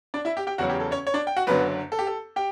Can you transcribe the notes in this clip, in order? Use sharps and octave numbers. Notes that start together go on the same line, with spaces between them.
D4 D5
E4 E5
G4 G5
G4 G5
E2 C#3 F#3 F#4 F#5
G4
A4
C#4 C#5
C#5
D4 D5
G5
F#4 F#5
F#1 F#2 D3 F#3 B3 B4
A4
G4
A4
G4 G5